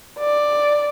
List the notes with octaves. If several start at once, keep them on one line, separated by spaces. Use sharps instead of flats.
D5